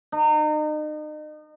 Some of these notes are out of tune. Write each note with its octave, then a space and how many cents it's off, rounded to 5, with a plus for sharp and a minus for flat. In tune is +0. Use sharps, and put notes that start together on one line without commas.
D#4 -35